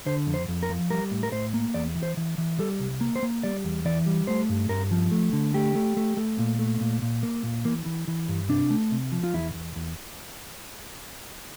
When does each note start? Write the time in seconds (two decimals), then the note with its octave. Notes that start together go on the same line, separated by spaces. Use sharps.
0.06 D3 C5
0.27 F2
0.34 C5
0.48 F2
0.63 A#4
0.70 F3
0.90 G3 A#4
1.11 A2
1.23 A#4
1.32 A2 C5
1.54 A#3
1.74 E2 D5
1.95 E3
2.03 C5
2.17 E3
2.38 E3
2.59 G3 A4
2.80 C2
3.01 A#3
3.16 C5
3.23 A#3
3.43 G3 D5
3.65 E2
3.85 E3 D5
4.06 G3
4.27 A3 C5
4.49 G2
4.69 G2 A#4
4.91 F3
5.11 A3
5.33 D3
5.54 A3 G4
5.75 A3
5.97 A3
6.17 A3
6.39 A#2
6.59 A3
6.81 A#2
7.02 A#2
7.23 A#3
7.43 A#2
7.65 E3 A#3
7.86 E3
8.08 E3
8.28 G2
8.49 C3 D4
8.70 A3
8.91 C3
9.12 F3
9.24 F4
9.33 E2 E4
9.54 E2
9.76 E2